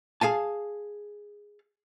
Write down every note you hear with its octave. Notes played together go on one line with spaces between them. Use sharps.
G#4 F5 G#5 A5